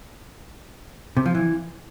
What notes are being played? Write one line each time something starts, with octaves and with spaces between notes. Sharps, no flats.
C3
F3
E3